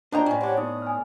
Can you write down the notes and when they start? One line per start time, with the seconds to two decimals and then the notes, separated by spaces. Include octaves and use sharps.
0.12 F3 D4 D5 D#5 G5 A#5
0.26 A2 C#4
0.41 C4 D4 G4 C#5 F#5
0.57 B3 D#4 D#6
0.82 G#5 F6